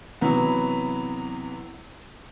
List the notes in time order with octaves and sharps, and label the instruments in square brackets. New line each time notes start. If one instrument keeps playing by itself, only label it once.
[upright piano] C3 E3 F#3 B3